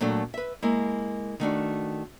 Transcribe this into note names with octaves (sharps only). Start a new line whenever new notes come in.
A#2 F#3 A3 D4 A4
B4 E5
G#3 A#3 E4
D#3 A3 D4 F#4